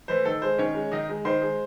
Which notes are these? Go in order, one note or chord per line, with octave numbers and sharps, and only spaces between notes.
E3 A3 C5
D#3 A4
G#3 C5
D#3 C#4 C#5
G#3
D#3 D#4 D#5
G#3
D#3 C5 C6
G#3